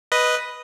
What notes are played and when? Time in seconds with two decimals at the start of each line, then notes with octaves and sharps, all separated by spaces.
0.12 B4 D#5